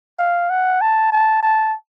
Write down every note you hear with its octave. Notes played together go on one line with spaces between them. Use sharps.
F5
F#5
A5
A5
A5